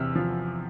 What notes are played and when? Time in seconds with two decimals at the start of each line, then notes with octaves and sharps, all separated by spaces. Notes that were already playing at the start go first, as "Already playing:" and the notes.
Already playing: E2 C3 E6 F6
0.16 F3